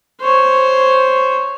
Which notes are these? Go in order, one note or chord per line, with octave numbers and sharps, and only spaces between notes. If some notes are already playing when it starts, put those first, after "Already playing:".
C5 C#5